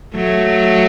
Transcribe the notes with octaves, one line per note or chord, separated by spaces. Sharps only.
F#3 A3